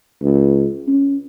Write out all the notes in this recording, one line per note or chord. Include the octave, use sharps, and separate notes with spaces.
C#2
C#4